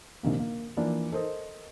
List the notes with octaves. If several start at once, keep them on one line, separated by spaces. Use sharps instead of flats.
A#1 C3 D#3 A#3
A#3
E3 F3 A#3 D4
A4 A#4 C5 D#5